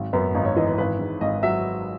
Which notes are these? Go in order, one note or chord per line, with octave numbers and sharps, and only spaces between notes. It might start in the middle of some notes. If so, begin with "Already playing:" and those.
Already playing: G#1 F#3
F#2 B3
G#1 D#4
C#5
E3 D#5
B4
G#1 B4
G#2
G#1 D#5
F#3 E5